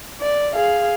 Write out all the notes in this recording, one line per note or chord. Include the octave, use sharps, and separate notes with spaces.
D5
G#4 F5